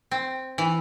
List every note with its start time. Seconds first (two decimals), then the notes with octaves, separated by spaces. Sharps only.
0.11 C4
0.58 E3